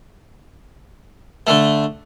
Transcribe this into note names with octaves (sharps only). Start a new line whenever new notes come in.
D3 A3